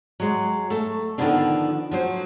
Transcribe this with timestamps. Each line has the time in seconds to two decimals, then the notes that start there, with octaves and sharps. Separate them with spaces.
0.20 F#3 G#3
0.70 A3 A5
1.18 D3 D#3 F3 B3 C#4 D4
1.91 F3 F#3 C5